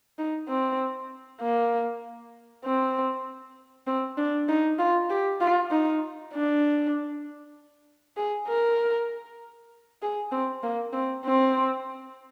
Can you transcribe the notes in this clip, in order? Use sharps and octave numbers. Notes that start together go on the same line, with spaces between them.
D#4
C4
A#3
C4
C4
D4
D#4
F4
G4
F4
D#4
D4
G#4
A#4
G#4
C4
A#3
C4
C4